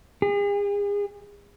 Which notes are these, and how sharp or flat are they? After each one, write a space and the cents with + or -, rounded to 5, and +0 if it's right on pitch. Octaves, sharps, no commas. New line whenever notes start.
G#4 -40